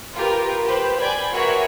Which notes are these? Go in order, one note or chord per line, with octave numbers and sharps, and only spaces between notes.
F4 G4 A#4 B4
G4 B4 C5
D5 G5 G#5 B5
F#4 G#4 A#4 B4 C#5 E5